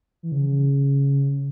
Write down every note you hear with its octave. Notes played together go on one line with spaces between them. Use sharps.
E3
C#3